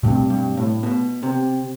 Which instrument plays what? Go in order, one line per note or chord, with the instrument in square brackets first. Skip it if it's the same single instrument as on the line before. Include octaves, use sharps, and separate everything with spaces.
[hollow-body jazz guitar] G2 [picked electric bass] B2 A3 C4
[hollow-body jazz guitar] G2
A2
B2
C3